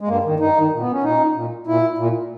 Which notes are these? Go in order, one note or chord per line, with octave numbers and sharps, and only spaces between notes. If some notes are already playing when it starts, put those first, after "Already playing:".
G#3
G2 A#3
D#3
G2 D#4
D#3
A#2
B3
C#4
A#2 D#4
A#2
A#2 E4
A#2